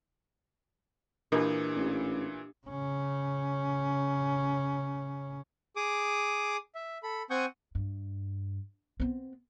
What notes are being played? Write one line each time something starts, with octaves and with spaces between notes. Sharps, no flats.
A#2 E3 D4 G4 A#4 B4
A1
C#3 C#4
G#4 D6 D#6
E5
A4 B5
C4 F#5 G#5 C#6 D#6 G6
G2
B3 C4